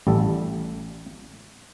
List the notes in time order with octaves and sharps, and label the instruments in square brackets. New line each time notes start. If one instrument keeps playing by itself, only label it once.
[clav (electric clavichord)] A1 G3 A4